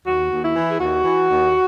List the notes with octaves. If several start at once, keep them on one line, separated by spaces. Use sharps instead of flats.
D#2 F#4
D#2
E4
E3
G#4
D#2 F#4
E3
D#2